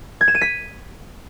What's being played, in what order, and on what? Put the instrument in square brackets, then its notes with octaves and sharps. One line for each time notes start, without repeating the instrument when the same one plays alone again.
[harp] G#6
E7
D#7
B6